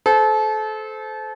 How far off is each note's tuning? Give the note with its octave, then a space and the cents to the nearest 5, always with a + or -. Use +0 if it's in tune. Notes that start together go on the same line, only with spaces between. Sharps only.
A4 -30 C5 -20